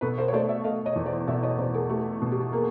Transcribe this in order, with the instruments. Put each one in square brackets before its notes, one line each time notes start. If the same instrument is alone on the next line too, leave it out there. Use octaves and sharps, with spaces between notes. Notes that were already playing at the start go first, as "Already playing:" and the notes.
[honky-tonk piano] B2 [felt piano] A4 B4
[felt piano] A#4 C5
C#5
[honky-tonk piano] A3 [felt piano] C5 D5
[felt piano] D5 E5
[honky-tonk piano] A3 [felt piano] D#5 F5
[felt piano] C#5 D#5
[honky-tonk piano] E2
[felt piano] C5 D5
[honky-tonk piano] B2 [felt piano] D5 E5
[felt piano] C#5 D#5
[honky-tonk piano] B2 [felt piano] C5 D5
[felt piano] G#4 A#4
[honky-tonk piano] A3 [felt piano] G4 A4
[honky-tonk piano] B2
[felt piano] G4
[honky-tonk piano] A#3 [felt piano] G#4